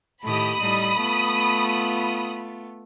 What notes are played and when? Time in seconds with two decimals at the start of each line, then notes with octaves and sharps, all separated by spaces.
0.24 A2 D#3 G4 B5 D#6
0.60 A2 G3 D#4
0.98 A3 B3 F4